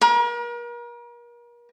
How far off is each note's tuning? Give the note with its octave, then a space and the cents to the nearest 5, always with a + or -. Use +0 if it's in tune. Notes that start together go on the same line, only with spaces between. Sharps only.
A#4 +40